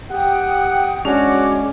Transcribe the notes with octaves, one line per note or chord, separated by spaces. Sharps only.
G4 F#5 G5 D#6
G#3 C#4 D4 F#4 C#5 D6 F7